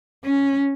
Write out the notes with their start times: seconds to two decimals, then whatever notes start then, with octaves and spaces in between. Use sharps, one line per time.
0.25 C#4